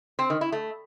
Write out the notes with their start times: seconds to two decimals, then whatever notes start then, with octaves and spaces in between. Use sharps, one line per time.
0.19 C4
0.30 D#3
0.41 E4
0.52 A3